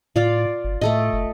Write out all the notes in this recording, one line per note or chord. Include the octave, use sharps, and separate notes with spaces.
A2 F4 D5 F5
G1
A2 A3 A4 D#5
F#1